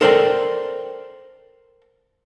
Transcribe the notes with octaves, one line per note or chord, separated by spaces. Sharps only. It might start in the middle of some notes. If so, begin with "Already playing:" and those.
A4 A#4 C5 D5 F5 G5